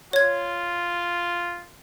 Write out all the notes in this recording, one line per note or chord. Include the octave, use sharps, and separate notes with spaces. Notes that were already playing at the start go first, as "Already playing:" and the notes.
F4 C#5 G#6